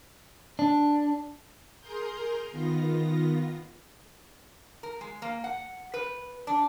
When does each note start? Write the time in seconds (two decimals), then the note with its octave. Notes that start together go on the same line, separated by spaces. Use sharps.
0.59 D4
1.81 G#4 A#4 A#5 C6 G6
2.51 D#3 B3 F4 A#6
4.83 A#4
5.01 G#3
5.22 A#3
5.44 F#5
5.94 B4
6.47 D4